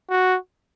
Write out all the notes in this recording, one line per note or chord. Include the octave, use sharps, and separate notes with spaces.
F#4